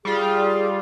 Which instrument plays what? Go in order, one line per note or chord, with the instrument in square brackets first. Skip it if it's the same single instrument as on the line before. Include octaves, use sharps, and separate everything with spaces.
[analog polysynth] G3 F4 [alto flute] G#4